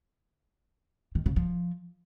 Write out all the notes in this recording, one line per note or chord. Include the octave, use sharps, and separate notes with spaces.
D#3
C#3
F3